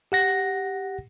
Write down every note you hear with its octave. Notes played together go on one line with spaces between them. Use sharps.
G4 F#5 A#6